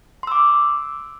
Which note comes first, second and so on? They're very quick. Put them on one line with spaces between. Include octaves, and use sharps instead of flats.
C6 E6 D6